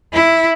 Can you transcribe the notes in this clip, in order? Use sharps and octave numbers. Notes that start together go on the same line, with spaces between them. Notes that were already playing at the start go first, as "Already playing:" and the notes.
E4